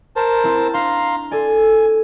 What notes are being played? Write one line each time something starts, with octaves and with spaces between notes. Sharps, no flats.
A#4 C5 A5
C4 E4
D4 F5 A#5 C6
A4 D5 G#5